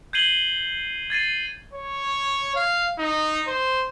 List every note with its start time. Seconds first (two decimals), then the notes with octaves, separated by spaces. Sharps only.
0.13 G6 G#6 C7 D#7 F#7 G7
1.10 G#6 A6 C7 D#7
1.73 C#5
2.56 F5
2.99 D#4
3.47 C5